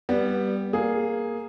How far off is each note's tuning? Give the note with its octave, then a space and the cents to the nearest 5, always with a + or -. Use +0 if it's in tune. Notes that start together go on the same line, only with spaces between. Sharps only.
G3 +0 B3 -15
A#3 +0 G#4 +0